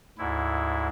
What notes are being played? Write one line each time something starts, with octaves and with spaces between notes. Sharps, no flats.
D2 G#2 E4